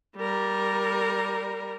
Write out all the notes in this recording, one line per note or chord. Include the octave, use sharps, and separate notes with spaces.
G3 A#4